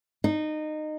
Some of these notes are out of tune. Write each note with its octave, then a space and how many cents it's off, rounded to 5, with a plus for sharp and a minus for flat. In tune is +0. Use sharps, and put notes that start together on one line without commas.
D#4 -20